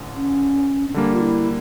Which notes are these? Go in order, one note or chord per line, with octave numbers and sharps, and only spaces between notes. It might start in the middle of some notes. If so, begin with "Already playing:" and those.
Already playing: A1 D3
C#4
C#4
D3 G3 A#3 D4
F4
E4